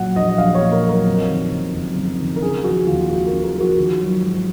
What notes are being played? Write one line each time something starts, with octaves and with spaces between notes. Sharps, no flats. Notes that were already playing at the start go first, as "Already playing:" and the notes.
Already playing: A#2 F#3 F#5
A#1 D#5
D#5
A#1 F5
C#5
A#2
A#4
F#3
A#4
F2
D#3
F#1
F#1
F2
D#3
A#4
C#3 G#4
F3 F#4
D#2 F4
G#3 F#4
A#4
C#3
A#4
F3
F#4
D#3
F#3
G#2